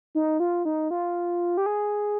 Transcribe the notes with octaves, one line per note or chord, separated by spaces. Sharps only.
D#4
F4
D#4
F4
G4
G#4